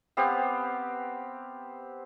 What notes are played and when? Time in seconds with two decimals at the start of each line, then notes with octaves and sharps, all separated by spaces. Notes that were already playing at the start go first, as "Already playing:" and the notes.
0.17 B3 C4 G4 F5